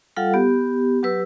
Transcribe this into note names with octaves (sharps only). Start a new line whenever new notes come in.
G3 F4 A4 F5 F#5
B3 G4
F#3 G4 B4 E6